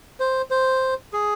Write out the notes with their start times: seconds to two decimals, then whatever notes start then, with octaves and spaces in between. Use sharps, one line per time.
0.20 C5
0.51 C5
1.13 G#4